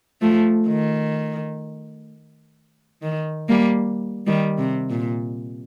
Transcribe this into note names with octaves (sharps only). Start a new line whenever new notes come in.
F3 A3
D#3
D#3
G3 A#3
D#3 G3
C3
A#2